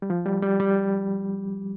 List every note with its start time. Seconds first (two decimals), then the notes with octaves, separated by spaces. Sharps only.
0.02 G3
0.10 F3
0.26 G3
0.43 G3
0.60 G3